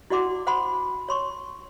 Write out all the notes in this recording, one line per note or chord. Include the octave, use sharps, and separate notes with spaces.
E4 F#4 D5 F#5 C6 D6
C5 F#5 G5 B5 C6
C#5 C6 C#6